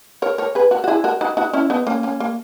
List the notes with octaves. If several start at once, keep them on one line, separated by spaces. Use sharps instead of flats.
A#4 C#5
A#4 C#5
G#4 B4
F#4 A#4
F#4
E4 G#4
F#4 A#4
D#4 F#4
D#4 F#4
C#4 E4
B3 D#4
A#3 C#4
A#3 C#4
A#3